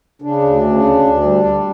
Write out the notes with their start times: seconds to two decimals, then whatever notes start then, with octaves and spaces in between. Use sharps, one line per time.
0.22 C#3 D4
0.42 D2
0.61 C#3
0.83 D2
1.02 D2
1.23 G3
1.43 D2